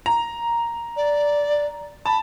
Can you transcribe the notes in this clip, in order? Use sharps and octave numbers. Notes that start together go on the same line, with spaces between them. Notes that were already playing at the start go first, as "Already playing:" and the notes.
A#5
D5
A5 B5